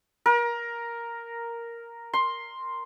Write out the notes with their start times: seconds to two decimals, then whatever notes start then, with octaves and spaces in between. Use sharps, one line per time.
0.26 A#4
2.13 C6